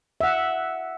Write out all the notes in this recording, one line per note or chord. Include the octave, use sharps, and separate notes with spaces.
E5 F#5